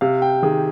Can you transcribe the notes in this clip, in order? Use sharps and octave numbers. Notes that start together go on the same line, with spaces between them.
C3 F5
G5
D#3 G#4